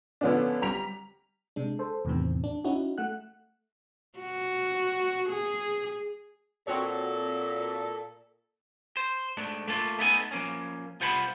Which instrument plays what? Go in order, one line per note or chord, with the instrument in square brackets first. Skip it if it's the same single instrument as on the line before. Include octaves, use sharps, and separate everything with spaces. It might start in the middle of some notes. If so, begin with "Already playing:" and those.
[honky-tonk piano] D3 F3 B3 C#4 D4
G3 A#5 B6 F7
[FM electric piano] C3 G#3 D4
A4 C5
E2 A2 C3 D#3 E3 C4
D4
C#4 D#4 E4 F#4
A3 F#5 F#6
[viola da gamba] F#4
G#4
[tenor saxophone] A#2 [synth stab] C4 F#4 C#5 [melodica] A4
[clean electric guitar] C5
G#2 A3 D4
A3 A#3 F4
A3 B3 D#4 A4 G5 G#5
F3 A#3 C#4
C2 F4 C5 F#5 G#5 B5